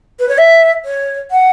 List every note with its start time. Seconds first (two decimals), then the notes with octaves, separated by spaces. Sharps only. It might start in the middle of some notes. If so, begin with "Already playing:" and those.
0.19 B4
0.29 C#5
0.38 E5
0.85 C#5
1.31 F#5